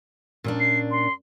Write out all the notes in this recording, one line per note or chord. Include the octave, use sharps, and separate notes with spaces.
A#2 C#4 D4
C7
C6